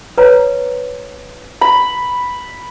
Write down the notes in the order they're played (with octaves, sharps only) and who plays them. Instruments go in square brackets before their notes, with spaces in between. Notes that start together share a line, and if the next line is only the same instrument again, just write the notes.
[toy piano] B4 C#5 A#5
[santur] B5